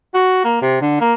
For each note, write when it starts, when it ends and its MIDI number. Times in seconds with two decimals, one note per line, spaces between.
0.14 0.41 66
0.45 0.60 58
0.62 0.81 48
0.81 0.98 50
1.01 1.14 58